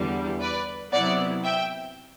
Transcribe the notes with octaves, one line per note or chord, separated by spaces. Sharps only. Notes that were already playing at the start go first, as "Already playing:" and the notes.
Already playing: E2 D3 G3
B4 D5
C3 F#3 B3 E4 D5 F#5
E5 G5